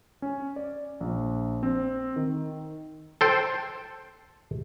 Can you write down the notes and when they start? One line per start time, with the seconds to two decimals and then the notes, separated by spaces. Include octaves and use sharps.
0.22 C#4
0.56 D5
1.01 A#1
1.63 C4
2.16 D#3
3.21 A4 C5 G5